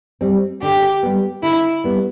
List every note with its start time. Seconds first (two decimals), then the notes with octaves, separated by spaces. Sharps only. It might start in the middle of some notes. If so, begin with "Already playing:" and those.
0.21 G3 C4
0.62 D3 G4
1.03 G3 B3
1.43 D3 E4
1.84 G3 B3